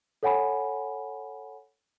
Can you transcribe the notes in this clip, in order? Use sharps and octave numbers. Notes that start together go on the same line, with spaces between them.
A4 C#5 F#5 G#5 B5